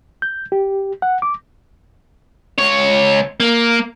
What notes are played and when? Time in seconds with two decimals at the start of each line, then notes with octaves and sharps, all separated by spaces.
0.22 G6
0.52 G4
1.02 F#5
1.22 D6
2.59 C#2 C#5
3.40 A#3